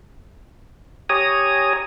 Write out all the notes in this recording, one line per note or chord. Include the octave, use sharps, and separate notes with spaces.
G4 C#5 G#5 A#5 D#6